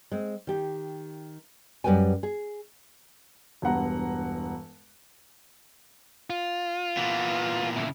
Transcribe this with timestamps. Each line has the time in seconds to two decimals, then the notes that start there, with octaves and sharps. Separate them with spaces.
0.12 G#3 C4
0.47 D#3 G4
1.84 F#2 G3 B4 G5 G#5
2.23 G#4
3.62 E1 G2 B3 F#5 A#5
6.30 F4
6.97 A#2 E3 B3
7.77 C#3 E4